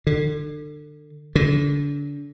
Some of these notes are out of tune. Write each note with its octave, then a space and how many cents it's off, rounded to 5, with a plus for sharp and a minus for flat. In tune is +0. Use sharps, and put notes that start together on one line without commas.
D3 +30
D3 -30